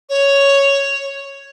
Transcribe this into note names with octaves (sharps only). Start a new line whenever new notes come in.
C#5